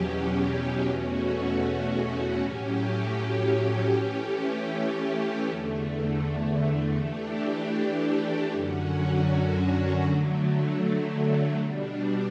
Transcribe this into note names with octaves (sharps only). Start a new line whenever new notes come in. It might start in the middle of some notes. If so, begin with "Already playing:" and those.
Already playing: E2 B2 F#3 C#4 G4
E2 B2 A3 C#4 F#4
A2 F#3 C#4 G4
E3 A3 C#4 G4
E2 D3 A3
E3 A3 D4 G4
F#2 D3 F#3 C#4 F#4
D3 F#3 A3
B2 G3 D4